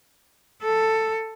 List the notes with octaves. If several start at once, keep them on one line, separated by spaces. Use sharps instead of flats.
A4